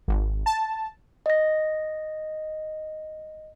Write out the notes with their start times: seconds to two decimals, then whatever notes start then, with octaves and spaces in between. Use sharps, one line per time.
0.08 G#1
0.46 A5
1.26 D#5 A#6